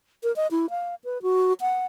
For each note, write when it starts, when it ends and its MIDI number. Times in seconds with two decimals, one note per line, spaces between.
0.23 0.34 70
0.36 0.47 75
0.51 0.70 64
0.70 0.95 77
1.04 1.22 71
1.22 1.53 66
1.61 1.86 78